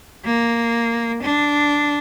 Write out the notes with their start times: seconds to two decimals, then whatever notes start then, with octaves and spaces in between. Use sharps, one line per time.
0.25 A#3
1.22 D4